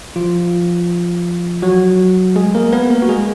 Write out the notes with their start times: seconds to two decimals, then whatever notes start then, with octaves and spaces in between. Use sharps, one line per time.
0.16 F3 F4
1.62 F#3 F#4
2.36 G#3 G#4
2.55 A#3 A#4
2.72 B3 B4
2.91 A#3 A#4
3.02 F#4
3.09 G#3 G#4